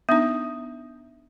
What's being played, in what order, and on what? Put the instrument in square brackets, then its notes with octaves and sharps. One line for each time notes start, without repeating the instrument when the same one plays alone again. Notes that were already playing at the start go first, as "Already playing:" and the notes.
[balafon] B3 D4 D#4 [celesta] E5 D#6